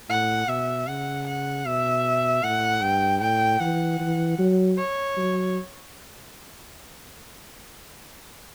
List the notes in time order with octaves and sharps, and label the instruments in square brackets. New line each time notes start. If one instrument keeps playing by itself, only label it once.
[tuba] A2 [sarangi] F#5
[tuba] B2 [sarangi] E5
[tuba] C#3 [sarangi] F#5
[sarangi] F#5
[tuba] B2 [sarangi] E5
[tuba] A2 [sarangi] F#5
[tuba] G2 [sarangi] G5
[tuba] A2 [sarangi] G5
[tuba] E3 [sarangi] F#5
[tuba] E3
F#3
[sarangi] C#5
[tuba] F#3